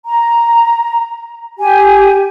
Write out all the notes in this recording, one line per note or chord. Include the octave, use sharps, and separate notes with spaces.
A#5
G4 G#5